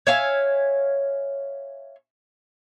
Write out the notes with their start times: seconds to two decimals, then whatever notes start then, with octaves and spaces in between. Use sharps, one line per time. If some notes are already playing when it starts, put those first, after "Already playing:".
0.07 C#5 E5 F5 G#5